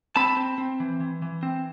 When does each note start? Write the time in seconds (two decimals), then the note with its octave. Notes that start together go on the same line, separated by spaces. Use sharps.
0.16 C4 A5 B5
0.37 C4
0.58 C4
0.80 E3
1.00 E3
1.22 E3
1.43 C4